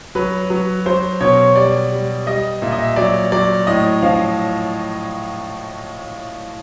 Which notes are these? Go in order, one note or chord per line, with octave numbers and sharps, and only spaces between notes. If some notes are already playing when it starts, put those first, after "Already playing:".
F#3 B4
F#3
F#3 C5
B2 C#5
G3 D5
G3
G3 D#5
A#2 E5
D#5
E5
F#3 D5
F#3 D5
A2 D#5
F3 F5